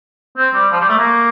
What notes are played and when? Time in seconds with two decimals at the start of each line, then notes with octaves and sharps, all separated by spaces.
0.37 C4
0.54 G3
0.72 F3
0.81 G3
0.89 A3
0.98 A#3